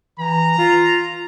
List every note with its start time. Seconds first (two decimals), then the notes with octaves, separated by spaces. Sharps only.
0.19 E3 A#5
0.58 F4